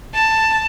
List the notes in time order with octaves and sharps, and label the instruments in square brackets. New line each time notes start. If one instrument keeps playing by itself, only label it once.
[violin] A5